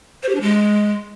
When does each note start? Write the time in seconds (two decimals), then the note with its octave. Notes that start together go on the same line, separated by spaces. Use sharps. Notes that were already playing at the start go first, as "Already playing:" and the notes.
0.23 C5
0.29 G4
0.35 D4
0.41 G#3